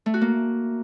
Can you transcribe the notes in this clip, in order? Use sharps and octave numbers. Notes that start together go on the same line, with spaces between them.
A3
F#4
A#3